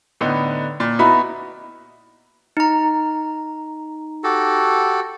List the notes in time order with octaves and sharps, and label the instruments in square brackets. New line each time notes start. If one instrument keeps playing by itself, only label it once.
[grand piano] A2 D3 B3 D#4
A#2 A6
B3 D#4 E4 F#4 A#5 B5
[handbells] D#4 A#5
[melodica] F#4 G4 A4